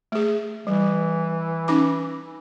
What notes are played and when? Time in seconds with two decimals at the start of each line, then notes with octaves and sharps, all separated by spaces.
0.12 A3 G#4
0.67 E3 G3
1.68 C#4 D#4 D6